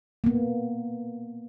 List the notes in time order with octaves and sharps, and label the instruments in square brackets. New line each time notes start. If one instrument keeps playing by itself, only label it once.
[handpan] A#3 B3